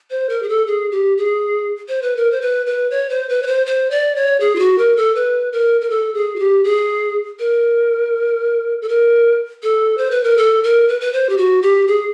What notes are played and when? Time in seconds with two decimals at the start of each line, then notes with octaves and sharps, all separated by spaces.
0.11 C5
0.29 A#4
0.43 G#4
0.49 A4
0.67 G#4
0.91 G4
1.18 G#4
1.88 C5
2.02 B4
2.17 A#4
2.31 C5
2.41 B4
2.66 B4
2.91 C#5
3.10 C5
3.29 B4
3.43 C#5
3.47 C5
3.66 C5
3.91 D5
4.16 C#5
4.40 G#4
4.56 F4
4.59 F#4
4.78 A#4
4.97 A4
5.15 B4
5.53 A#4
5.81 A#4
5.90 A4
6.14 G#4
6.36 F#4
6.39 G4
6.64 G#4
7.39 A#4
8.82 A4
8.89 A#4
9.63 A4
9.98 C5
10.11 B4
10.24 A#4
10.37 A4
10.64 A#4
10.88 B4
11.01 B4
11.13 C5
11.29 G4
11.38 F#4
11.62 G4
11.87 G#4